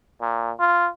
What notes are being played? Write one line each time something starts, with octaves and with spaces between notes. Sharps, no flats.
A#2
F4